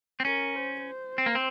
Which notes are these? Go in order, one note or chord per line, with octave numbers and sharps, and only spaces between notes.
C4
C#4 A#4
C5
C5
C4
A#3
C4